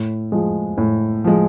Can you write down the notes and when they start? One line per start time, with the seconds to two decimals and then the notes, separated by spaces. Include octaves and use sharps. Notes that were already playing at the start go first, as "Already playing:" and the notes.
Already playing: A2
0.32 F3 G#3
0.78 A2
1.24 F3 G#3